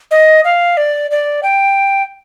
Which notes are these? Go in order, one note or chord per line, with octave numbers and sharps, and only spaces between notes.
D#5
F5
D5
D5
G5